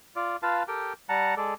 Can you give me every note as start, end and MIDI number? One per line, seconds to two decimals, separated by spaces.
0.16 0.37 65
0.16 0.37 74
0.43 0.63 65
0.43 0.63 71
0.43 0.63 77
0.43 0.63 81
0.68 0.93 67
0.68 0.93 69
0.68 0.93 70
0.68 0.93 79
1.09 1.35 55
1.09 1.35 78
1.09 1.35 81
1.09 1.35 82
1.37 1.54 56
1.37 1.54 69
1.37 1.54 74